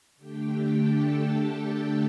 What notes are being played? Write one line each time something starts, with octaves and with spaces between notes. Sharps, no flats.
D3 A3 D4 G4 G5
A4 A5